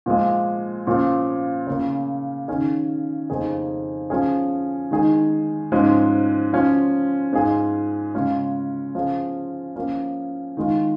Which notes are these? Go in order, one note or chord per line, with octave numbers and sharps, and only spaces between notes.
A#2 F3 G#3
A#2 F3 C#4 F4
C#3 A#3 C#4
D#3 C#4 G#4
F2 C#3 A#3 D#4 G#4
F3 C#4 G#4
D#3 G#3 D#4 G#4
G#2 F3 G#3 C#4
F3 C#4 F4
G#2 G#3 F4 G#4
C#3 G#3 C#4 F4
F3 C#4 F4 G#4
F3 A#3 C#4
D#3 G#3 F4